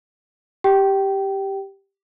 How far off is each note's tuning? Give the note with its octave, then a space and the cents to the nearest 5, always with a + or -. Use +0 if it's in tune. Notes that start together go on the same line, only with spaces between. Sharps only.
G4 +0 G5 -20